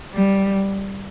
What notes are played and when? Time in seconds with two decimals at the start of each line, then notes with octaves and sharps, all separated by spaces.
0.14 G3